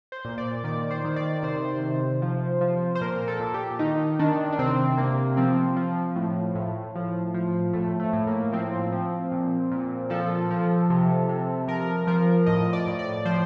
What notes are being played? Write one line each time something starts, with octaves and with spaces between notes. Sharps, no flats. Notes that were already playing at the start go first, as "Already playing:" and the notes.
C5
A#2
D5
D#3 D5
C5
D#3
D5
C3 C5
C3
F3
F3
C5
A#2 A#4
A4
A#2
G4
D#3 D#4
D#3 D4
D4
C3 C4
C3 A#3
F3 C4
F3
A2
A2
F3
F3
A2 A3
A3
A2
A#3
F3 C4
F3
A#2
A#2
F3 A4
F3
C3
C3
F3 A#4
F3 A#4
A2 D#5
D5
A2
D5
F3 C5